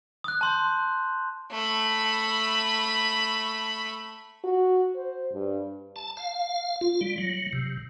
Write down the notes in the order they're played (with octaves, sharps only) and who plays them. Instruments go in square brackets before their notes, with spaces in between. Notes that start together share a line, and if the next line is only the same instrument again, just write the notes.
[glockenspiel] D#6 F#6
A5 C6 G6
[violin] A3 B5
[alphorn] F#4
C5
G2
[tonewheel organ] A5
F5
F4
G3
F#3
C3